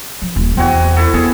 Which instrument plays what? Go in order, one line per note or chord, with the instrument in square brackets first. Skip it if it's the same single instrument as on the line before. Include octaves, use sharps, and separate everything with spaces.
[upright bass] F3
D#1
[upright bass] E2 [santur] C4 F#4 G#5
[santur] E4 A4
[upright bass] B3 [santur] G#4